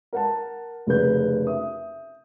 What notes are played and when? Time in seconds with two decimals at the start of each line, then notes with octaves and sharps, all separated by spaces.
0.13 A#4 F#5 A5
0.87 F1 C#3 A#4 B4 G6
1.47 E5 D#6